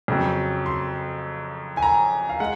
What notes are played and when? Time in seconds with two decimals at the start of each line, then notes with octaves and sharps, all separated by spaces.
0.08 F2 C#3 F#3 C4
0.66 C6
1.77 G#5
1.82 A#5
2.29 F5
2.40 G#3 F#5